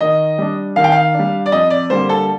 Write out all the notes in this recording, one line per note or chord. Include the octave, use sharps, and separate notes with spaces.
D#3 D#5
G3 D4
D#3 F5
G5
F5
G3 D4
D5
F2 D#5
D5
D3 G3 A#3 C5
A4